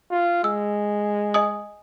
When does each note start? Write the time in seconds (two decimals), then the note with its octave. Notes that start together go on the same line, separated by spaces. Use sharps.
0.11 F4
0.44 G#3 E6
1.34 D#5 G#5 D#6